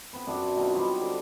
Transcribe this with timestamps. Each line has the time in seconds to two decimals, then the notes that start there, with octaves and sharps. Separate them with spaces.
0.13 B3 C4 B4
0.27 F#2 C4 D4 F#4
0.56 B2 C4 D#4 F4
0.75 F#3 G3 B3 C4
1.01 D3 C4 C6 D6